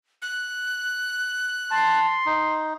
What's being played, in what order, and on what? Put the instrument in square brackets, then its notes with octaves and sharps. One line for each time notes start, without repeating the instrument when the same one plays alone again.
[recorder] F#6
[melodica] A5 [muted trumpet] C6
[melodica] D#4